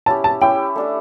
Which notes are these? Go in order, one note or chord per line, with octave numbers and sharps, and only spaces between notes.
C#4 E4 G4 A5
A5
C#4 E4 G4 G5
A3 D4 G4